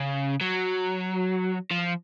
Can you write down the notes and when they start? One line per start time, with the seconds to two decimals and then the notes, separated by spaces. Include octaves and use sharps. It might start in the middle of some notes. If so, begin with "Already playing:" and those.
Already playing: C#3
0.41 F#3
1.71 F3